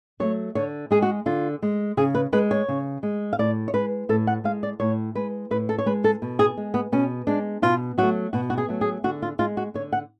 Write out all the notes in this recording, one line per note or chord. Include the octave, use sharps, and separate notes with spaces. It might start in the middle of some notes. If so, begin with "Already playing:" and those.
F#3 A3 C#5
D3 C#5
G#3 G#4
F#4
D3 F4
G#3
C#3 G#4
B4
G#3 B4
C#5
C#3
G#3
F5
A2 D5
C#5
G#3 B4
A2 A4
F#5
G#3 F5
D5
A2 C#5
G#3 B4
A2 B4
A4
C#5
G#3 B4
A4
B2
G#4
G#3
B3
B2 C#4
G#3 D4
B2 F4
F#3 A3 F#4
B2 F#4
F#4
G#4
F#3 A3
G#4
D3 F#4
F4
G#3 F4
F#4
D3 C#5
F#5